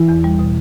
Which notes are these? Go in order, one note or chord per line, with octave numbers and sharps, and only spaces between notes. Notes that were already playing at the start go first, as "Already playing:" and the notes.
Already playing: E3 E4
E2
G3
B2